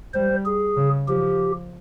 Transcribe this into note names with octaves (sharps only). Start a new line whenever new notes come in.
G3 C5
G#4
C#3
F3 G4